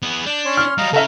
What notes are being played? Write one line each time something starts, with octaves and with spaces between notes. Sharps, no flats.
B3 G#4
D4 G6
C#4 C#5 C6
F6
F#3 G3 D#5 F5 A#5
C#3 C#4 A4 E5 A#5